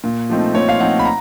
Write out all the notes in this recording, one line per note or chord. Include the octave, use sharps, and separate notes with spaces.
A#2
F3 A3 C4 D#4
A#2 C#5
F5
F3 A3 C4 D#4 F#5
B5
A#5